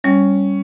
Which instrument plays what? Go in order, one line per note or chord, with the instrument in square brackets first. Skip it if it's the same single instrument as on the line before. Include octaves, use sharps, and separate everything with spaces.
[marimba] G3 [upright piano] C#4